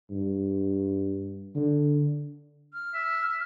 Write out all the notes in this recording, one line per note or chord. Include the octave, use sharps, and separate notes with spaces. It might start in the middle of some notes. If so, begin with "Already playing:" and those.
G2
D3
F6
E5